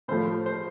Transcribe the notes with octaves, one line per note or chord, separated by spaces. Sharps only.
A2 F3 A3 C5
C5